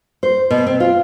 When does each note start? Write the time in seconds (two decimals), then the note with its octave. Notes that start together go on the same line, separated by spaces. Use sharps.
0.23 C5
0.51 B2
0.67 C4
0.80 F4